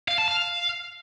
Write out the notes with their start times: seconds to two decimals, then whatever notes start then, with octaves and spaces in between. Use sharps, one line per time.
0.08 F5
0.18 A5
0.28 F5